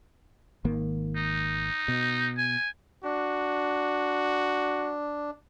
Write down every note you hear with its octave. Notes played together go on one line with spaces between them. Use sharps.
G#1 D#3 A#3
D#4
B2
G#5
D4 F#4